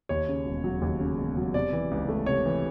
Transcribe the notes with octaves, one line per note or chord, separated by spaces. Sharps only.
D#2 C#5
C#3
E1
F#3
D#2
C#3
E1
F#3
C3 D5
E3
C#2
A3
C3 C#5
E3